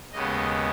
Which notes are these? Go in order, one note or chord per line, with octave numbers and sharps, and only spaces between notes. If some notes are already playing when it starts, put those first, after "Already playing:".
D#2 C#3 G#3 B3 D#5